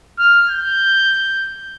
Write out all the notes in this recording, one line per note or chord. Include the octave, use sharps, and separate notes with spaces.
F6
G6